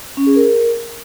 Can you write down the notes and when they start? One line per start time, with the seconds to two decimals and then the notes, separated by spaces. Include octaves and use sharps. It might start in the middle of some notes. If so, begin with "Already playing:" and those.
0.17 C#4
0.27 G#4
0.36 A#4